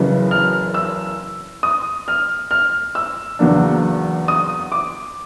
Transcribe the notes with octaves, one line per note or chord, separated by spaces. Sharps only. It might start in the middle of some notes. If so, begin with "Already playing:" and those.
Already playing: F#1 F#2 C#3 E3
F6
E6
D#6
F6
F6
E6
E2 C#3 F#3 A#3 D4
D#6
D6